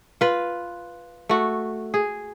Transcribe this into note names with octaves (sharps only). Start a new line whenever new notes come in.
F4 B4
A3 F#4
G#4